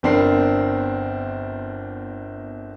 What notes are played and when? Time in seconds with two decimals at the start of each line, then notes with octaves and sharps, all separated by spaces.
0.03 G1 B3 C4 D4 A#4 C7